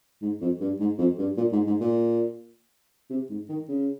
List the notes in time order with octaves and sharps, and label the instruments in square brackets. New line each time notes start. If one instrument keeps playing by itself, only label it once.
[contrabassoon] G#2
F2
G2
G#2
F2
G2
A#2
G#2
G#2
A#2
C3
G#2
D#3
C#3